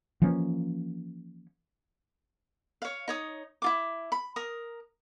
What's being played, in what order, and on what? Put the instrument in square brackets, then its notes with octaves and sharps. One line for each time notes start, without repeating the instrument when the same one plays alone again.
[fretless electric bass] E3 F3 A#3 C#4
[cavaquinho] C#5 F5
D#4 C#5 D#6
E4 F4 D6
B5
A#4 D#6